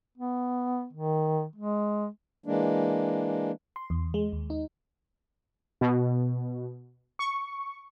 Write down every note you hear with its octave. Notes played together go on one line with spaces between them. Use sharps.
B3
D#3
G#3
E3 G#3 A#3 D4
C6
E2
G#3
D#2
D#4
B2
C#6